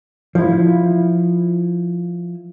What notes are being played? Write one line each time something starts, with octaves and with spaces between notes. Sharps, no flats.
F3 E4